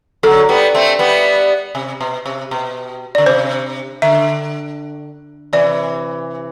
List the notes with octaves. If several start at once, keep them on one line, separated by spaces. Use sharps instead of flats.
D3 F#3 A4
G3 B3
A3 C4
G3 B3
C3
B2
C3
B2
D3 D5
C3 C5
D3 E5
C3 E3 D5